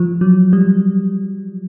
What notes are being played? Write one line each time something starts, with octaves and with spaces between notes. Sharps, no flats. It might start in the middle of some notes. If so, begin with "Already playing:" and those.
Already playing: F3
F#3
G3